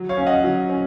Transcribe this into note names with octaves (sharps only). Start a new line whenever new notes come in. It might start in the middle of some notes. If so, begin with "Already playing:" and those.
Already playing: F#3
C#5 F5
C#4
D#5 F#5
F#3
C#4